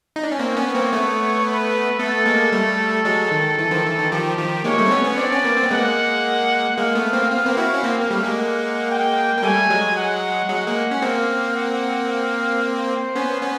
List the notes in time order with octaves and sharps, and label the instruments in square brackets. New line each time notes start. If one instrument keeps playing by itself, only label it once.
[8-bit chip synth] D#4
D4
C#4
[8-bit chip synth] A#3 C4 [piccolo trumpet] C#5
[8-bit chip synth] B3 C#4
A#3 C4
A3 B3
[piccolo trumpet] B4
[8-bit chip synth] A3 B3 [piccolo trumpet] A4
[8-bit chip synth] G#3 A#3
G3 A3
F#3 G#3
D#3
E3
D#3 F3
E3
D#3
[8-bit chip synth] D#3 F3 [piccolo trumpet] G4
[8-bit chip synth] D#3 F3
[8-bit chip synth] G#3 A#3 [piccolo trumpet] C#5
[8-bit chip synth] G3 A3
C4
B3 C#4
B3 C#4
[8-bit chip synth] C4 D4 [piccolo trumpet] D5
[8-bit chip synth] B3 C#4
A#3 C4
C4
B3
[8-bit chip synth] G#3 A#3 [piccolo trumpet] F#5
[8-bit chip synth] G#3 A#3 [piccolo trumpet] F5
[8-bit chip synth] A3 B3
A#3 C4
[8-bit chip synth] C4 [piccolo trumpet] F5
[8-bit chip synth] B3
A#3 C4
E4 F#4
C#4
A#3 C4
A#3
G3 A3
G#3 A#3
[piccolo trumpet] F#5
G5
[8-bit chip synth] A#3
[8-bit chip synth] G3 A3 [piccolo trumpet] G#5
[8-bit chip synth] F#3 G#3
[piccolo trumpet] F#5
[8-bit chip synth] F#3 G#3 [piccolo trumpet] F#5
[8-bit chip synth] G#3 A#3
C#4
[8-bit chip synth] A#3 C4 [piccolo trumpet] F5
[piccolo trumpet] F#5
F5
C5
[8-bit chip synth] B3 C#4
B3 C#4